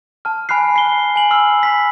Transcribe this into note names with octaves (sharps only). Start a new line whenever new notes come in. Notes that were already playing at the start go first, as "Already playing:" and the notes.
A5 F6
G#5 B5 F6 F#6 C7
B5 C7 G7
G#5 F#7
B5 E6 F6 C7
B5 B6